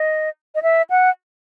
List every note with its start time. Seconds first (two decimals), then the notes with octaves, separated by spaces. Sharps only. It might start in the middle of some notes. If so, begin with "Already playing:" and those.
Already playing: D#5
0.55 D#5
0.63 E5
0.90 F#5